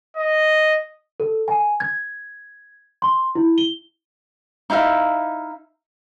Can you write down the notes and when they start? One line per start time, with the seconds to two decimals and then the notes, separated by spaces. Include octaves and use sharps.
0.16 D#5
1.20 A4
1.48 G#5
1.80 G#6
3.02 C6
3.35 E4
3.58 G7
4.70 D#4 E4 E5 F5